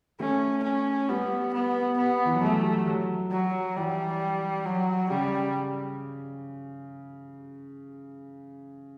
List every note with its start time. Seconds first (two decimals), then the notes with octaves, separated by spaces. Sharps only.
0.20 A3 C#4
0.64 C#4
1.09 G3 B3
1.54 B3
1.98 B3
2.25 E3
2.34 F#3
2.43 G3 A3
2.87 F#3
3.31 F#3
3.76 E3 G3
4.66 F#3
5.10 C#3 G3